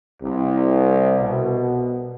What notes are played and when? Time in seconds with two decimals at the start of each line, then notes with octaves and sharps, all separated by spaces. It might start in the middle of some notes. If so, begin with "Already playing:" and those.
0.22 C2
1.20 B2